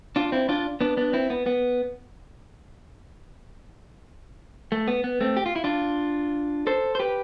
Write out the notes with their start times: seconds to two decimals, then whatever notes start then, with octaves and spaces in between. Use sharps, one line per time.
0.16 D4 F4
0.32 C4 E4
0.49 D4 F4
0.81 B3 D4
0.97 B3 D4
1.13 C4 E4
1.30 B3
1.46 B3
4.72 A3
4.88 B3
5.04 B3
5.20 A3 C4
5.37 G4
5.46 F4
5.56 E4
5.64 D4 F4
6.67 A4 C5
6.95 C5
6.99 G4 B4